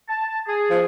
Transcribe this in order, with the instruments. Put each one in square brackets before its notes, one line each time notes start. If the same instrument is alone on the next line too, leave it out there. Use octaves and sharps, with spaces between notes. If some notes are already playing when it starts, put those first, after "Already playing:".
[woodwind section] A5
G#4
[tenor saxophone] F3